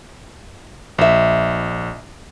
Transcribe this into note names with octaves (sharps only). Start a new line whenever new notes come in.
A#1 D#5 E5